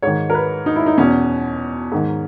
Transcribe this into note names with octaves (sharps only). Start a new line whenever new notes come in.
G#2 D#3 C#5
A#4
B4
D#4
E4
D#4
E2 B2 C#4
G#2 D#3